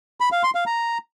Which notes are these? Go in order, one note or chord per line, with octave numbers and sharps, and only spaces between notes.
B5
F5
C6
F5
A#5